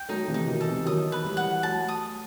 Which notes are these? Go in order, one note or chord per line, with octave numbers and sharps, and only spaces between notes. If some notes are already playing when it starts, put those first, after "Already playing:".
Already playing: G5
F#3 A3 D#4
C3 E3
D#4
B2 D#3
A4
C3 E3
D#3 F#3 D#6
B4
E3 G3
F#5
F#3 A3 A5
D#6